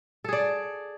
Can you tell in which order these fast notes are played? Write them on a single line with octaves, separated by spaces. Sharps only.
A4 G#4 D5